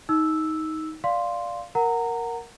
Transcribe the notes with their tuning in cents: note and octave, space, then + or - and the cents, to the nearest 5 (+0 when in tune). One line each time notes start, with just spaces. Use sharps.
D#4 +15 E6 +0
D5 +0 F5 +0 C6 +0
A#4 +0 F#5 +0 A#5 -20